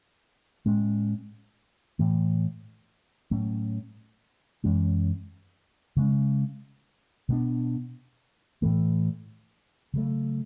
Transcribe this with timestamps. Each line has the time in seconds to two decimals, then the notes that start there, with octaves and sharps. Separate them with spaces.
0.66 A2 G#3 C#4
1.99 A2 E3 A3
3.31 A2 F#3 A3 C#4
4.64 F#2 E3 G#3 C#4
5.97 C#3 G#3 C#4
7.29 B2 G#3 B3 D4
8.62 A2 E3 A3
9.94 C#3 F#3 A3